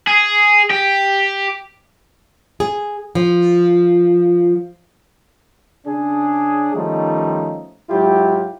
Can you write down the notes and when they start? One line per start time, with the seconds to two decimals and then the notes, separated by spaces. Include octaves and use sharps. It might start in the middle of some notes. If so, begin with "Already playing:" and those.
0.07 G#4
0.70 G4
2.60 G#4
3.15 F3
5.87 C#3 D4 G#4
6.74 D#3 F3 G3 A3 C#4 D#4
7.90 G#2 F#3 E4 F4 G4